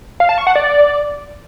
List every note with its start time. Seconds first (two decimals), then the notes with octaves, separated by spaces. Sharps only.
0.20 F5
0.29 A5
0.38 C#6
0.47 F#5
0.55 D5